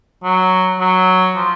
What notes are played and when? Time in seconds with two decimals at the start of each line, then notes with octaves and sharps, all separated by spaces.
0.24 F#3
0.80 F#3
1.36 F3